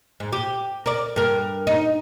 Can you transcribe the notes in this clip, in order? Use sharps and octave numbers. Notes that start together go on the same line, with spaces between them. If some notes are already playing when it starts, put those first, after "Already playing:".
G#2
G4
A#4 D5
G2 A#4
D#4